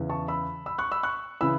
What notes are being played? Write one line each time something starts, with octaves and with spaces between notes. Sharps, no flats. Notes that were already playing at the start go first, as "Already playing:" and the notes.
Already playing: E2 C#3 E3
A5 C#6
B5 E6
B5 E6
C#6 F#6
B5 E6
C#6 F#6
C#3 E3 B5 E6